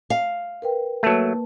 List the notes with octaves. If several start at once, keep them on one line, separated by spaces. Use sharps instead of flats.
F5
A#4 B4 G5
F#3 A3 A#3 B4 A5